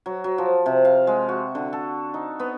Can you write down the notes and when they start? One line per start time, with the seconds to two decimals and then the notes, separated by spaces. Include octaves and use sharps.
0.06 F#3
0.24 F#3
0.38 F3
0.66 C3
0.85 F5
1.07 G#3
1.29 F#4
1.55 D3
1.73 A4
2.14 D#4
2.40 B3